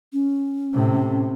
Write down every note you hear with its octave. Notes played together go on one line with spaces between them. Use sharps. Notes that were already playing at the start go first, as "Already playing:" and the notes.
C#4
A2 C3